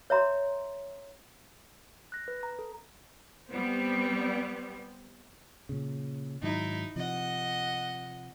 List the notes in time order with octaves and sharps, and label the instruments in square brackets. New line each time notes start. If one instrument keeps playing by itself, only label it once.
[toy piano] C#5 E5 A#5 C6
[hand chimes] F#6 A#6
B4
A#5
A4
[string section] G3 B3 C4
[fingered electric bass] A#2 C#3
[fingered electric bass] G#2 D#3 F#3 [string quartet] D#4 E4
[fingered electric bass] C3 F3 [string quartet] D#5 F#5